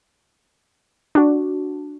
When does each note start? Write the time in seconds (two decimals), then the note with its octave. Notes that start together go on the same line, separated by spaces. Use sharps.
1.15 D4 F#4